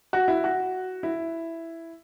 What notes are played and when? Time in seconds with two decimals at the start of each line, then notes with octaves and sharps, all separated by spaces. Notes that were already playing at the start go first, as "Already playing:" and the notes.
0.13 F#4
0.28 E4
0.44 F#4
1.03 E4